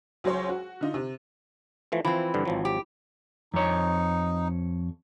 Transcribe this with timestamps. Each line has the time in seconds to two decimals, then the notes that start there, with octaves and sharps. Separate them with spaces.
0.24 C#2 F#3 C5 C#5 C6
0.49 F#4
0.81 D3 D#4 F4
0.94 C3
1.92 E3 F3 A3
2.05 E3 F3 C4
2.34 G2 D3
2.45 G#1 F3 F#3
2.65 G4
3.54 F2 D#4 C#5